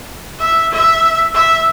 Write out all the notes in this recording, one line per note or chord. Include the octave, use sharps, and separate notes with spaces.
E5
E5
E5